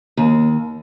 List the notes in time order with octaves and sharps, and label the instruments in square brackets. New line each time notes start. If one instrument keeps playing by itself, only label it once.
[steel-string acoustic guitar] D#2